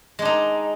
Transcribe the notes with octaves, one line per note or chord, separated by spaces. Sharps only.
G#3 D4 D#4